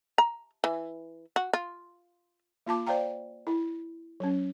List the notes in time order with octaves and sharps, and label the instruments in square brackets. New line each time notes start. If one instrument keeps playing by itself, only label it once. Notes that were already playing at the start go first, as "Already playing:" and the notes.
[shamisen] A#5
E3
F#4
F4
[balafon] A#3 F4 A5 D6
C5 D5 F5 G5 A#5
E4
F#3 C#4